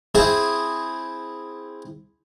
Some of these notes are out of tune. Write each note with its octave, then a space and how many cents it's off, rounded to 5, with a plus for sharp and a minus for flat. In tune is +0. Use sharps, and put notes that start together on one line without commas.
C4 +0 E4 +0 G#4 +0